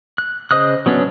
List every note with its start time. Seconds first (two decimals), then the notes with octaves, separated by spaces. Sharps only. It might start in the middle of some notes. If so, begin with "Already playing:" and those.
0.18 F#6
0.51 C#3 C5 D#5 D#6 F#6
0.86 F#3 B3 C#4 D4